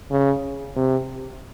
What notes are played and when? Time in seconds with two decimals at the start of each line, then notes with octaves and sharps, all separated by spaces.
0.11 C#3
0.77 C3